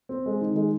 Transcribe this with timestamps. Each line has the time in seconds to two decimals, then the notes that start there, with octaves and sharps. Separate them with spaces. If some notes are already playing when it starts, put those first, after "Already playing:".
0.09 C4
0.26 G#3
0.41 D#3
0.56 G#3